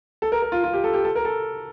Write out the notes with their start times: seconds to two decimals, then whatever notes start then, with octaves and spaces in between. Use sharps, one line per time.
0.22 A4
0.32 A#4
0.42 A#4
0.52 F4
0.64 F4
0.73 G4
0.84 A4
0.94 G4
1.04 A4
1.15 A#4
1.25 A4